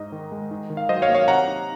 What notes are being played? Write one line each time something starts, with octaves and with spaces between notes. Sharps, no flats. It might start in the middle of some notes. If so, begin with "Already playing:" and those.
Already playing: G#2 D#4 D#5
D#3
G#3
D#3
D#3
F5
F#3 C5 D#5
C#5 F5
A#3
C#5 F5
C3 F#5 A#5
D#4